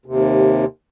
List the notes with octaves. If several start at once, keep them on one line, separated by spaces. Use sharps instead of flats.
D#2 C3